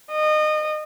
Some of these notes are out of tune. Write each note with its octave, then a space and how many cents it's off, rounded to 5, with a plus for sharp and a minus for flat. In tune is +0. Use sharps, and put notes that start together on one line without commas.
D#5 -25